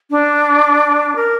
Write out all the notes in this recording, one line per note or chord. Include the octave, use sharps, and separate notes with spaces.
D4
A#4